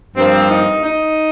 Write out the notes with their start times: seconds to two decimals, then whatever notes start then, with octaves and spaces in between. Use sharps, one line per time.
0.17 G2 F3 A#3 C4
0.51 D#4
0.85 D#4